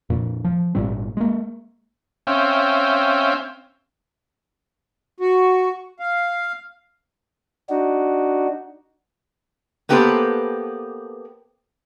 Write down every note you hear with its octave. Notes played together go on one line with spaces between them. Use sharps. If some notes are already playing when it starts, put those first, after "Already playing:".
F2 A#2
F3
G#1 A#2 G3 C4
G#3 A#3
C4 C#4 E5 F5 G5
F#4
F5
D4 D#4 F#4
A#3 B3 G4 A4 B4 C5